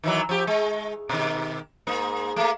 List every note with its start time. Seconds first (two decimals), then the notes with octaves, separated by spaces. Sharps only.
0.03 D#3 E3 F#3
0.29 F3 G4
0.47 G#3
1.09 B2 D#3
1.87 G#2 A#3
2.36 A3 A#3